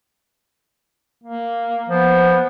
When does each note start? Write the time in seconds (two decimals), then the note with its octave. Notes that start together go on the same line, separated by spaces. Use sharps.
1.24 A#3
1.88 F3 B3